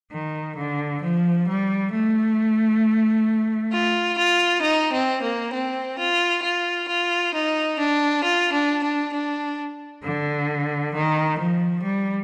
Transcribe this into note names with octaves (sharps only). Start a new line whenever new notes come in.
D#3
D3
F3
G3
A3
F4
F4
D#4
C4
A#3
C4
F4
F4
F4
D#4
D4
F4
D4
D4
D4
D3
D#3
F3
G3